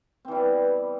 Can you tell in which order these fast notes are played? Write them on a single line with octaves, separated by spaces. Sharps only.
C4 E3 G3 B3